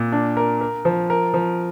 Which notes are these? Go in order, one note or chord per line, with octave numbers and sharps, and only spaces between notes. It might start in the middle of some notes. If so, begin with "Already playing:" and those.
Already playing: A#2
D4
A#4
A#4
F3
A#4
F3